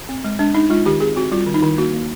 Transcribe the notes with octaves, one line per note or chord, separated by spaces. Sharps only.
C4
G#3
G#3 D4
G#3 D#4
G#3 F4
D#3 G4
C4 G#4
C4 F#4
G3 F4
D#3
D#4
D#3 E4
A#3 F#4
A#3